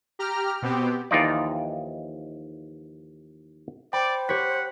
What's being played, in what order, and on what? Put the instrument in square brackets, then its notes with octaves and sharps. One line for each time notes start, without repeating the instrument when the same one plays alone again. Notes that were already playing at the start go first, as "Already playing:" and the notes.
[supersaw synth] G4 A#5 F6
B2 B3 C4 G4
[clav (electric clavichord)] D#2 E3 F3 D#4 F4 D5
[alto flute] C5 [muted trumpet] D5 [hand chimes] G5 [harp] B5
[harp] G4 C#5 [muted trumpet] F#5 [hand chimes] B6